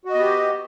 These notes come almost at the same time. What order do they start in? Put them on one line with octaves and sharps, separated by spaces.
F#4 D#5 B3 G4